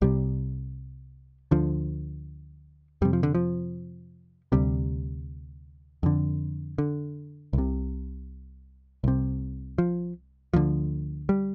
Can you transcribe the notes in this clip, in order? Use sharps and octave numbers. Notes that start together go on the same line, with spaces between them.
C2 C3 G3
D2 D3 F3
F2 C3 G3
F3
D3
F3
D2 C3 G3
F2 D3
D3
C2 C3
C2 C3
F3
D2 D3 F3
G3